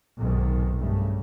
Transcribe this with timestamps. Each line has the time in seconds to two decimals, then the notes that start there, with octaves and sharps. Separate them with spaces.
0.19 B1 G#2 C3 D#3
0.79 G2 C#3 A3